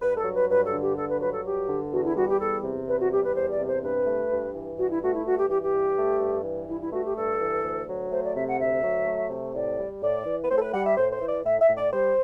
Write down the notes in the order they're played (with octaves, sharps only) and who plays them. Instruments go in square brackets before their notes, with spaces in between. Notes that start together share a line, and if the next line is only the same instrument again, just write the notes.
[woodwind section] G2 B4
A4
F#3
B4
G2 B4
A4
D3
G4
G2 A4
B4
F#3 B4
A4
G2 G4
D3
E2 F#4
E4
G3 F#4
G4
E2 A4
C3
E2 B4
F#4
G3 G4
B4
E2 C5
D5
C3
C5
G2 B4
A3
G2
E3
G2 F#4
E4
A3 F#4
E4
G2 F#4
G4
E3 G4
G4
G2
A3
G2
E3
G2 E4
E4
A3 F#4
G4
G2 A4
E3
D2
F#3
A3 C5
D5
C3 E5
F#5
D2 E5
F#3
A3
C3
A2 D5
G3
A2 D5
E3
B4
A2 C5
A4
B4
G3 F#5
E5
A2 C5
C5
E3
D5
A2 E5
E5
A2
D5
G3 C5